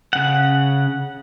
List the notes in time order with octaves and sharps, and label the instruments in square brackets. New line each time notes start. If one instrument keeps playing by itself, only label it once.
[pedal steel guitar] C#3 F#5